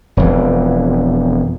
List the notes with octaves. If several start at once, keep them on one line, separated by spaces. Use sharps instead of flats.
E1 F2 E3